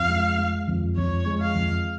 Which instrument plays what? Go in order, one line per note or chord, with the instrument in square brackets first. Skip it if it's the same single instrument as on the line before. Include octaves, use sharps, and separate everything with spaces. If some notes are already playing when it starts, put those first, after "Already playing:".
Already playing: [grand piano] F2 [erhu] F5
[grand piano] G#3
G#3
F2
[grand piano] F2 [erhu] C#5
[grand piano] G#3
[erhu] F5
[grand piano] F2